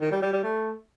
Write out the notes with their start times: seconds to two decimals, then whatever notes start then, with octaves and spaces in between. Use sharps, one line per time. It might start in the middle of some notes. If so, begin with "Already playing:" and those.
0.01 D#3
0.12 G3
0.22 G3
0.33 G3
0.43 A3